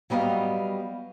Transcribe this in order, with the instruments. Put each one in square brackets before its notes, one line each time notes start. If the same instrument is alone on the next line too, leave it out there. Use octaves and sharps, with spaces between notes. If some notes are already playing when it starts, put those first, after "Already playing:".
[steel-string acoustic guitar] F#3 G3 B3 D#5 F5